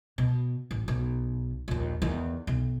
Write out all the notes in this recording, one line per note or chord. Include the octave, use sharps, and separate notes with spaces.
B2
A1
B1
A#1 D#2
E2 D#3
B1